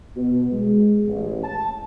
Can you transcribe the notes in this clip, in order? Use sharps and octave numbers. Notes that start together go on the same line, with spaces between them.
B2
G#3
A1
A5